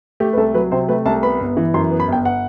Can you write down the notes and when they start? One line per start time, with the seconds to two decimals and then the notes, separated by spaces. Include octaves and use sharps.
0.20 A3 G4
0.33 B4
0.37 C2 A4
0.54 F#3 B4
0.72 C3 C5
0.88 A3 B4
1.06 C2 A5
1.23 B3 B5
1.40 G1
1.57 E3
1.74 F#2 C6
1.91 B3
2.00 B5
2.08 G1 G5
2.25 F#5